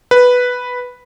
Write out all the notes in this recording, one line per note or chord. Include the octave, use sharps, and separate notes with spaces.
B4